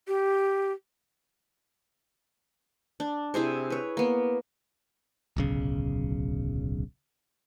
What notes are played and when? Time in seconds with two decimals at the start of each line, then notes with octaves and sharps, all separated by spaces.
0.08 G4
3.00 D4
3.34 C3 E4 G#4 C5
3.70 B4 C#5
3.97 A#3 B3
5.37 D1 B1 C#3